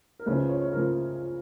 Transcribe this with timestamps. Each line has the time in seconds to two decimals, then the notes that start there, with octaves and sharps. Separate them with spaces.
0.19 A#4
0.26 C#2 C#3 F3 B4
0.38 B4
0.49 C#5
0.61 C#5
0.73 C#3 F3 A#4